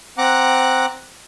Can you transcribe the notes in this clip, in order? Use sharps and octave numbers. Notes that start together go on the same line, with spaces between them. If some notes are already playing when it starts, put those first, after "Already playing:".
C4 F#5 A#5 D6 F#6